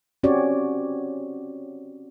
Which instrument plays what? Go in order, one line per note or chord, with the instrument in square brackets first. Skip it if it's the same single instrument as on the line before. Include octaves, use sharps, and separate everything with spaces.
[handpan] C4 C#4 F#4 G4 C#5 D5